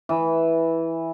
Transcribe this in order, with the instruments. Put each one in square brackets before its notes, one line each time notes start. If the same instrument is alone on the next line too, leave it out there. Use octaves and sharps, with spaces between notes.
[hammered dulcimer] E3